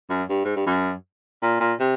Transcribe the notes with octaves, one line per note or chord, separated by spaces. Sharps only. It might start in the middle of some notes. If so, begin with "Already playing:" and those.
F#2
G2
G#2
G2
F#2
A#2
A#2
C3